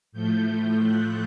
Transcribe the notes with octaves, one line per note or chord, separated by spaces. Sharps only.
A2 F3 A3 G6
F#6